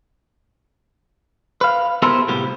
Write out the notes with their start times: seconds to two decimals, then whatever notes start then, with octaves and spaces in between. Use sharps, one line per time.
1.61 B4 F5
2.02 B3 E4 G4 A4 A#4 C5
2.28 C2 A2 B3 G4